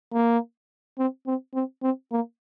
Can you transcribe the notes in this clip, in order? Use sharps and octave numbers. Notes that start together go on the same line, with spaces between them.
A#3
C4
C4
C4
C4
A#3